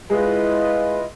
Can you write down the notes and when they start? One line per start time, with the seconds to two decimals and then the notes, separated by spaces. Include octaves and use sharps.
0.10 G#3 E4 F4 B4 D#5